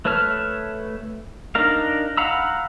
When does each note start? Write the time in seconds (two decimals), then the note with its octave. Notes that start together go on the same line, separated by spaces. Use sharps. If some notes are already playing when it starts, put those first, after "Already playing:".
0.05 A3 B4 C#5 A5 F6
1.55 D4 D#4 A#4 F5
2.17 F5 F#5 A#5 B5 E6